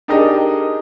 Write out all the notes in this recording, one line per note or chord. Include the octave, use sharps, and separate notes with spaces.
D4 D#4 G4 G#4 A#4 D#5